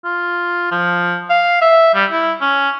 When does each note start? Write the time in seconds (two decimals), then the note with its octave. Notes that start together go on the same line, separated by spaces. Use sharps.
0.04 F4
0.71 F3
1.30 F5
1.61 E5
1.94 G3
2.11 E4
2.41 C#4